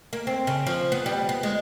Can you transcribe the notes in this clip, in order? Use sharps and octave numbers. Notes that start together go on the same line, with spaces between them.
A#3
C4
C#3
F3
B3
G3
B3
G#3